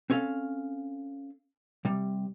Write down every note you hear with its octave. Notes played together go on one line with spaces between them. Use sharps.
C4 C#4 A4 F5
C3 G3